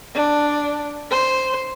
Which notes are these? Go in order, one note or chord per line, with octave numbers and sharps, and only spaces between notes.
D4
C5